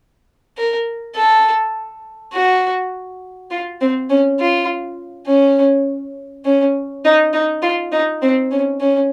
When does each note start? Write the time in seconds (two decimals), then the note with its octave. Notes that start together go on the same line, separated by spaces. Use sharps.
0.57 A#4
1.16 A4
2.34 F#4
3.51 F4
3.81 C4
4.10 C#4
4.40 F4
5.27 C#4
6.45 C#4
7.05 D#4
7.33 D#4
7.62 F4
7.92 D#4
8.22 C4
8.52 C#4
8.80 C#4